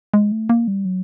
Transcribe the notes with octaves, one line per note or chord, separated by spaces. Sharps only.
G#3
A3
A#3
G3
F#3